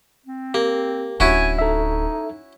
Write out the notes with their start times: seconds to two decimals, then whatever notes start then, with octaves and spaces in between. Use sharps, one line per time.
0.26 C4
0.54 A#3 G4
1.20 D1 C#4 D4 E4 F#4 G#5
1.59 D#4 A4 E5